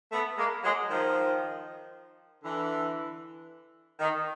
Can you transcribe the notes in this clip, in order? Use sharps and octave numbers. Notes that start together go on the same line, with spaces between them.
A3 B3
G#3 A#3
F#3 G#3
D#3 F3
D3 E3
D#3